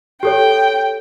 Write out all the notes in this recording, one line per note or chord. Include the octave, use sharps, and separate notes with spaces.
G4 A4 C#5 G5